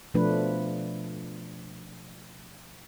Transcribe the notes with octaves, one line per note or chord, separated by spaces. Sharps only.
B2 F3 A3 D4 B4